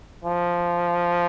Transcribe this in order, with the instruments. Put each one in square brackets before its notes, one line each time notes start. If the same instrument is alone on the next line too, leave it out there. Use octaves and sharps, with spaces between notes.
[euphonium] F3